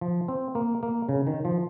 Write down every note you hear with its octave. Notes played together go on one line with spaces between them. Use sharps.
F3
C4
A#3
A#3
C#3
D#3
F3